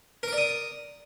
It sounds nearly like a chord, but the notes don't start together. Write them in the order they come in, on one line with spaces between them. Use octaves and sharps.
A#4 D6 D5 D#6